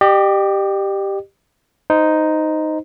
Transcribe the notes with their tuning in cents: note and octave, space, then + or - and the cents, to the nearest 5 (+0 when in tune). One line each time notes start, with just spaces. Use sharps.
G4 +0 D#5 -45
D#4 +0 C5 -15